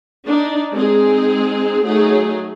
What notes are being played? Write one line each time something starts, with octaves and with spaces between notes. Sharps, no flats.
D4 D#4
G#3 C4 D#4 G#4
F#3 A3 D#4 G#4